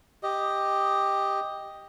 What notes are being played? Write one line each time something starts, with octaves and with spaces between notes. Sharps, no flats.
G4 D#5